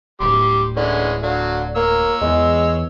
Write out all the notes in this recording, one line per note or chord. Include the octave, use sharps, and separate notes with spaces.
D1 G3 C6 D6
D3 E3 G#3 C#4
D3 F#3 F5
A#3 C#5 E6
E2 G#3